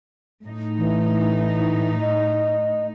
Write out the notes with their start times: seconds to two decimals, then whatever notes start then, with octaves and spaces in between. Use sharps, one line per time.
0.45 A2 D#4
0.78 E3
2.00 D#5